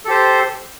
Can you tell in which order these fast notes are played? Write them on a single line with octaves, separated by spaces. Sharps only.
A4 G4 C5